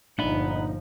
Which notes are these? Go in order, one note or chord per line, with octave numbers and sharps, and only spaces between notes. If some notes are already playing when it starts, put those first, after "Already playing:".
G1 A#2 F3 D4 D#4 E5 F#5 B5